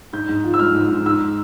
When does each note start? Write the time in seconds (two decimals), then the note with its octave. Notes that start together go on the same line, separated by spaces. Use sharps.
0.13 G#2 G6
0.29 G#2
0.44 F3
0.54 E6
0.59 G#3 F6
0.74 G#2
0.90 G#2
1.05 G#2 E6